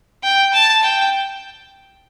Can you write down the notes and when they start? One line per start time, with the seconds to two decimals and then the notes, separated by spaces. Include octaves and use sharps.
0.23 G5
0.53 A5
0.83 G5